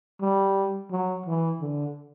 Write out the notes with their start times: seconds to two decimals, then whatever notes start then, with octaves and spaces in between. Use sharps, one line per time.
0.21 G3
0.91 F#3
1.26 E3
1.61 D3